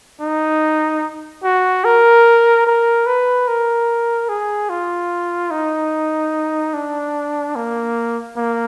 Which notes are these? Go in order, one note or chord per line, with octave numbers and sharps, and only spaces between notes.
D#4
F#4
A#4
A#4
B4
A#4
G#4
F4
D#4
D4
A#3
A#3